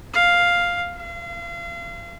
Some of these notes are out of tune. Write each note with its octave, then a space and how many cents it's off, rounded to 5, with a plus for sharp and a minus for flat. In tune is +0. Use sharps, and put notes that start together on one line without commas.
F5 +5
F5 -35